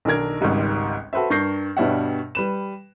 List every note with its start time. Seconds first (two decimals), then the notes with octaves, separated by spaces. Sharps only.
0.05 B1 D#3 D4 A#4 G#6
0.41 G#1 C#2 G#2 G3
1.13 F#4 A4 B4 C5 E5
1.30 G2 A#4 C#6 G6 A#6 C7
1.77 G2 B2 G3 C#5 E5 F#5
2.35 G3 B4 E7